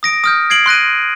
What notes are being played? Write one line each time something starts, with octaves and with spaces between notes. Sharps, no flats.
D#6 A#6 D7
D#6 F6 G6
G#6 C7 D7 F#7
C6 F#6 A#6 D#7